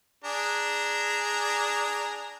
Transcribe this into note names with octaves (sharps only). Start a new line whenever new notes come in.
D4 G#4 A#5